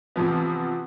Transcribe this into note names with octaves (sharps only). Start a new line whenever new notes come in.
C3 E3 F3 B3